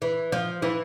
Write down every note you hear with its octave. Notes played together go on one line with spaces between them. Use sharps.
E3
F3
E3